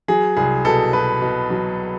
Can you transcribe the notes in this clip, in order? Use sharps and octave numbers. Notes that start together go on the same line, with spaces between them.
F#3 G#4
C2 G#4
B2 A4
B2 B4
B2
F#3